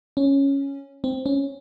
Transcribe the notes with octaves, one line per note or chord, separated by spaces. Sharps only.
C#4
C4
C#4